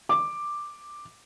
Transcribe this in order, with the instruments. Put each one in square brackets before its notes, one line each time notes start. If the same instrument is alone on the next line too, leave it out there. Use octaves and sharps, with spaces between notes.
[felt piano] D6